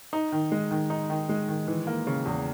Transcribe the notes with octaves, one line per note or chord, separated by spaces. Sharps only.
D#4
D#3
G#3
D#3
D#4
D#3
G#3
D#3
E3
A#3
C#3
E2